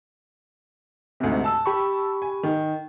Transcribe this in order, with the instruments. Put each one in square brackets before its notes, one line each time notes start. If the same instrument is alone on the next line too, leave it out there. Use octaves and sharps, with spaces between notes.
[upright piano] D2 G#2 C3
A5 E6
[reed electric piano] G4 B5 C#6
[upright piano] G#5
D#3